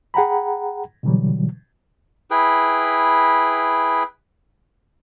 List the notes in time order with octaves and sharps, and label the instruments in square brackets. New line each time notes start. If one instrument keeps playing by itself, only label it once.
[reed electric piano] G#4 F#5 G5 A#5 B5
B2 D3 E3 F#3 G3
[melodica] E4 G#4 B4 G5